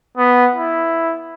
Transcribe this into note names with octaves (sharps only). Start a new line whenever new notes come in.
B3
E4